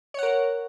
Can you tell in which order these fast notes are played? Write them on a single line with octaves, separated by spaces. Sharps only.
C#5 F#5 A#4